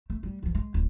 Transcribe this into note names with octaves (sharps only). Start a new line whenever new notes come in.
A3
G3
D#3 F3
G#3
D1